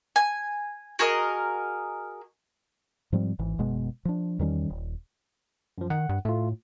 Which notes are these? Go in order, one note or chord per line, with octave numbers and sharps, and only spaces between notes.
G#5
F#4 G#4 A#4 D#5
G#2 F3 G3 C4
G#1 E3
F#1 B2 G#3 B3
F3 D4
E2 D#3 G3 C#4
D#1
F#2 F3
D#3 F#5
G2
A2 A3 F4